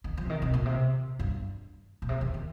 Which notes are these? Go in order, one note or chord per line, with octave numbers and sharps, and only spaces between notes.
D#3
F3
C3
D#3
C3
A#2
C3
G2
A#2
C3
D#3
D#3